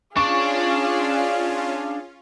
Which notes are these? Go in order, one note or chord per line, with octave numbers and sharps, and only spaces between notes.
C#4 D4 F4 G#4 D5 F5 C#6